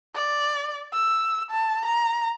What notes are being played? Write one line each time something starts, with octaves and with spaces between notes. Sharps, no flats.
D5
E6
A5
A#5